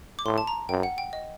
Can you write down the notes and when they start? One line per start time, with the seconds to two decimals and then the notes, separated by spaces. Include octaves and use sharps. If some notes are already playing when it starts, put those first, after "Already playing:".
0.19 D6
0.25 A2 C6
0.38 A5
0.47 A#5
0.69 F#2 G5
0.83 F#5
0.98 G5
1.13 D#5